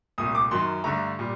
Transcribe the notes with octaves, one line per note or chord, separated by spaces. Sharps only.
C2 A#2 A3 D#6
D6
F#2 D#3 F#3 C6
G2 D3 A3 A#5
A#2 G3